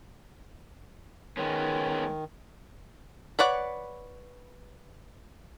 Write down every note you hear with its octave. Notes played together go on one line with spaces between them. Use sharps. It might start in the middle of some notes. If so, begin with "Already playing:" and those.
D#3 G#3 B3 C#4
B4 C#5 D5 F#5